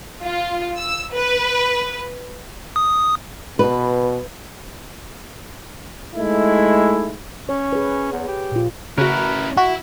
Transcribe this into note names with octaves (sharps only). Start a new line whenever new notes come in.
F4
E6
B4
D#6
B2 B4
G#3 A3 D#4 E4
C#4 C#5
G#4 B4
E2
G4
A#2 F4
C#3 C#4 E4 F#4 A#4 B4
E4 F#4